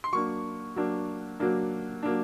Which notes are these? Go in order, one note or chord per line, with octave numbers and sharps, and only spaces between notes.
C6
F#3 A#3 D4 C#6
F#3 A#3 D4
F#3 A#3 D4
F#3 A#3 D4